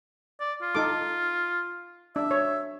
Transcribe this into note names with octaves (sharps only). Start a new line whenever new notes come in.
D5
F4
D#4 A4 D6
D4 E5
C#5